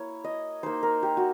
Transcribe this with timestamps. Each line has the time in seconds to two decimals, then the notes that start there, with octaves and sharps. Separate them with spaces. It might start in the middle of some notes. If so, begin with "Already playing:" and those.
Already playing: A#3 E4 C#5
0.24 D#5
0.63 A#3 D#4 C5
0.83 A#4
1.03 G4
1.17 F#4